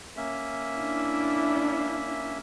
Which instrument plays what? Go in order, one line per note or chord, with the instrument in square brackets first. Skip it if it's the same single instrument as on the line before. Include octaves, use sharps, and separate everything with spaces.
[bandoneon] A#3 C#4 E5
[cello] D4 E4